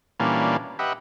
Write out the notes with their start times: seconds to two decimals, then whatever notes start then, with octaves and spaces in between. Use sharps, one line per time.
0.20 A#2 E3 G3 A#3 C#4 D4
0.79 G4 B4 D#5 E5 F#5